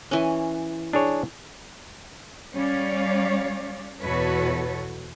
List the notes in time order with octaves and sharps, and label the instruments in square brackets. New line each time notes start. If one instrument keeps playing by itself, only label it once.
[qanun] E3 C#4
[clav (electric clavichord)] D4 G#4 C#5
[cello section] G3 C#4 C#5 D5 F5
E2 B2 F#4 A4 B4 C#5